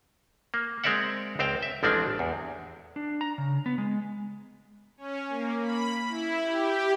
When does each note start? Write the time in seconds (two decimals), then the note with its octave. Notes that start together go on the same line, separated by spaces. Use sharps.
0.54 A#3
0.84 G#3 C4 A#4 D5 E5 F#5
1.39 C#2 C4 C5 F5 G5
1.63 E5
1.83 A1 F3 G#3 C4 D4 D5
2.19 E2
2.96 D4
3.21 A#5
3.38 C#3
3.66 B3
3.78 G#3
4.97 C#4
5.29 A#3
5.62 B5
6.08 E4
6.41 G4